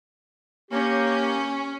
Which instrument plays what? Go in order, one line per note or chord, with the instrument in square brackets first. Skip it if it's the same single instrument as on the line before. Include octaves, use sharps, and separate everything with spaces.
[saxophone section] A#3 G4 [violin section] C#4